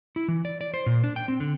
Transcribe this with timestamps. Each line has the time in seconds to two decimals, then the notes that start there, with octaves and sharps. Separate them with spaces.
0.16 E4
0.28 E3
0.45 D5
0.61 D5
0.74 C5
0.86 A#2
1.04 D4
1.16 G5
1.28 C4
1.40 D3